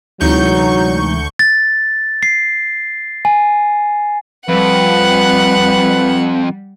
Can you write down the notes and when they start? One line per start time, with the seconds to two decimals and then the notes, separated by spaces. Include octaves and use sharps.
0.20 D2 C3 E3 F#3 G#3 D#4 C#6 G6
1.39 A6
2.23 C7
3.25 G#5
4.49 F2 G3 B4 F#5